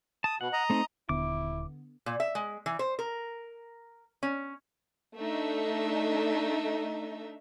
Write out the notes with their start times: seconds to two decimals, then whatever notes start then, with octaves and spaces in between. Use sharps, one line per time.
0.24 A5 D#6
0.41 B2 F#5
0.53 D#5 A#5
0.70 A3 C4 D#4
1.09 D#1 D3 B3 E4 D6
2.06 A#2
2.20 E5
2.35 G#3
2.66 E3
2.79 C5
2.99 A#4
4.23 C#4
5.17 A3 D4 D#4 E5